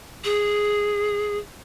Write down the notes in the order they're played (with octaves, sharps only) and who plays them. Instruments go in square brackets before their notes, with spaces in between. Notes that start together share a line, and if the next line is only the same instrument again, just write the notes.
[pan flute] G#4